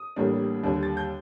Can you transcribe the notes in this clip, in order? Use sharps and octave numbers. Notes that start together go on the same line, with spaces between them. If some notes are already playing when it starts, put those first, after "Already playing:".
Already playing: D#6
A1 A2 G3 A#3 D4
D#2 D3 G3 D4
A6
G6